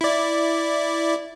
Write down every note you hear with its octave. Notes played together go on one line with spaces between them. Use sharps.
E4 D5